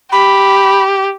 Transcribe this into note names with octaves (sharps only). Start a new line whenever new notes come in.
G4 B5